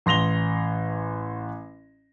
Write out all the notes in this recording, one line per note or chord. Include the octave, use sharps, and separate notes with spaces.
A1 C6 A#6 F7 G7